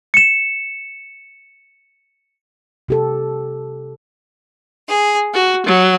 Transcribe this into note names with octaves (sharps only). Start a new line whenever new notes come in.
C#7 E7
C3 G4 A4
G#4
F#4
F#3